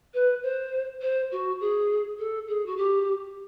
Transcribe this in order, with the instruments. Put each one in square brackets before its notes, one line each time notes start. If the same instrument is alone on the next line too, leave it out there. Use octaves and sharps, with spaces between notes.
[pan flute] B4
C5
C5
F#4
G#4
A4
G#4
F#4
G4